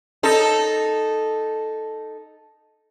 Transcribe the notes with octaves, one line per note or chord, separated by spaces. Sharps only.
D#4 A4